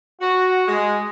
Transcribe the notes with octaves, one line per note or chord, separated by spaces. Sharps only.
F#4
G#3